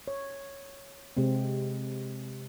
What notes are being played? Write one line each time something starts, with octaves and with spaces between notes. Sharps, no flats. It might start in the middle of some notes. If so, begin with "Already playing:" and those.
C#5
C3 G#3 C4